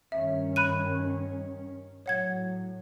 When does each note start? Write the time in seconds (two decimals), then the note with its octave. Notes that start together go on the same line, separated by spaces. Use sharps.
0.12 G2 D#3 C#4 E5
0.56 B5 F#6 D#7
2.06 A2 F#3 C#5 F#5 G#6